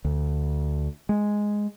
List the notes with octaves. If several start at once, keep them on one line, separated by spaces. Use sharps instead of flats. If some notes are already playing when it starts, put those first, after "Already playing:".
D2
G#3